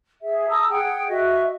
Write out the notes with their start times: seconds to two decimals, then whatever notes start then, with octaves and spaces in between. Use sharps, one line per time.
0.22 G#4 E5
0.48 A5 A#5 D#6 E6
0.69 G#4 F#5 G5
1.07 F#4 D#5 E5